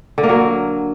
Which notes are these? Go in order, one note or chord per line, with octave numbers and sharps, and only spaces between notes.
D3
A#3
F#3